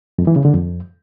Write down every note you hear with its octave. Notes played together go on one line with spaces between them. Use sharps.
F2
E3
C#3
D3
F2